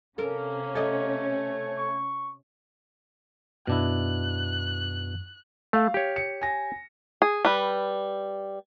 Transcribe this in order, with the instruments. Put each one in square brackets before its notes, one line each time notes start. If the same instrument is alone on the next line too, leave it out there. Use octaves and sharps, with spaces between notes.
[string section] C3 C#4 [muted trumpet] A#3 [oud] A4 A#4
[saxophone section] A3 C#5 [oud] A4 D#5
[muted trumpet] C#6
[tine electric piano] F#2 [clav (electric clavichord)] B2 D4 E4 [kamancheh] F#6
[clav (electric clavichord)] A3 [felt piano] F5
[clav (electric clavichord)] G4 C#5
[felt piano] C#7
G#5 A#6
[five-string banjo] G#4
G3 B4